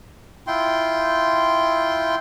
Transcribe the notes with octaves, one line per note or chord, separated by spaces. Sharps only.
E4 F4 G5 C6